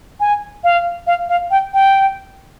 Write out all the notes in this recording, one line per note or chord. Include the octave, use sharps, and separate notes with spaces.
G#5
F5
F5
F5
G5
G5